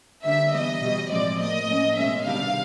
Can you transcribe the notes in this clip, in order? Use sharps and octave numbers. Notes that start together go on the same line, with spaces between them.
D3 G3 A#3 D4 E5
E3 G3 B3 D#5
B2 G3 B3
A2 F3 G#3 C4 D5
A2 F3 A#3 D#5
A2 F3 A#3 C#4
B2 G#3 C#4 E5
C3 D#3 G3 B3 D4 F5